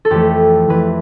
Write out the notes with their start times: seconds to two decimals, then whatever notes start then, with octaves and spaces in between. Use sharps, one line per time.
0.05 A4
0.10 F2 E3 A3 G4
0.68 F2 E3 A3 B4